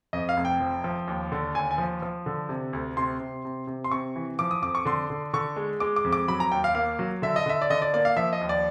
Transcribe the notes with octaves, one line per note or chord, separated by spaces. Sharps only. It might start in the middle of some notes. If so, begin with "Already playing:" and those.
F2 D#5
F5
F1
G5
F3
F3
D#2
D3
D#2 G#5
G#5
F3
F3
D3
C3
D2
C3 C6
C3
C3
C3
C6
C3 C#6
E3
F3 D6
D#6
F2 D6
C#6
D3 C6
D3
D3 C#6
G#3
G#3 D6
D6
F2
D6
F#3 B5
A#5
D#2 G5
F5
A#3 F5
F#3
D3 E5
D#5
D3 E5
D5
D3 D#5
D5
A#3 D5
F5
F3 E5
D#5
D#2
D5